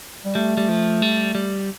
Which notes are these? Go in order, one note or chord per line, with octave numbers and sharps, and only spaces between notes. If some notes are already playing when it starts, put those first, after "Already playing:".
G3
G3 A3
G3
F3
G3
G3